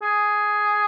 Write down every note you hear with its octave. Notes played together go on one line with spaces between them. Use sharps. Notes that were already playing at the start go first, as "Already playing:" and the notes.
G#4